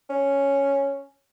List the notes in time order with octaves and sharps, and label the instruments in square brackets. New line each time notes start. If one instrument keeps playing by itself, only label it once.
[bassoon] C#4